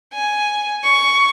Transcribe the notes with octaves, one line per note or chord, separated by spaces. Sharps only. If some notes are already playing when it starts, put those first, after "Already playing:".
G#5
C#6